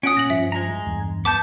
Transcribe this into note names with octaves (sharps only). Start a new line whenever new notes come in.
C#4 F4 F#5 D#6 D7
A#2 A#6 F#7
G2 F3 E5
G#3 A#5
E2 G2
B3 A5 D6 G6